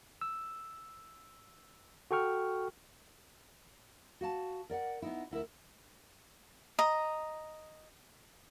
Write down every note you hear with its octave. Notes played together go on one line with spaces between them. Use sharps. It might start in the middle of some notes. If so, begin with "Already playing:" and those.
E6
F#4 A4 G5 C#6 F6
F#4 F5 A5
A#4 D5 F5 F#5
B3 D#4 E4
D2 E4 A#4 E5
D#5 A#5